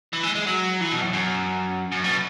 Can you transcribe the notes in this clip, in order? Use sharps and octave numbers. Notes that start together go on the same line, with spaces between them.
E3
G#3
G#3
F#3
E3
B2
F#2
F#2
F#2
B2